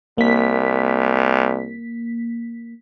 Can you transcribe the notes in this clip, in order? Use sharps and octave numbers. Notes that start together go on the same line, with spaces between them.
C2 A#3 B6